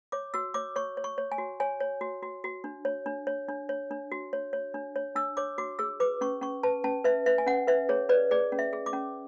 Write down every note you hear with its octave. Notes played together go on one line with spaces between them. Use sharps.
C#5 D6
F#4 E6
C#5 D6
C#5 C#6
C#5
C#6
C#5
G#5
F#4
C#5 G#5
C#5
F#4
F#4
F#4
D4
C#5
D4
C#5
D4
C#5
D4
F#4
C#5
C#5
D4
C#5
D4 E6
C#5 D6
F#4 D6
G#4 E6
B4 D6
C#4 C#6
C#4 C#6
B4 A5
C#4 A5
B4 E5
B4 E5
G#5
C#4 F#5
B4 E5
G#4 C#5
B4 D5
G#4 D5
C#4
E5
G#4
D6
C#4